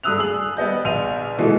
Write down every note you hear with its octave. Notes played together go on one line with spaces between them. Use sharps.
G2 A3 D#6 E6 F#6 F7
G#4 F#7
G3 B3 D#5 G6
A#1 D#7 F7
B2 E3 G#3 A3 D#4 F4